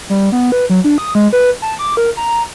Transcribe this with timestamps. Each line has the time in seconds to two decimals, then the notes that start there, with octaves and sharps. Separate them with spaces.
0.10 G3
0.32 B3
0.52 B4
0.70 F#3
0.84 D4
0.98 D#6
1.15 G#3
1.33 B4
1.62 A5
1.79 D6
1.97 A#4
2.17 A#5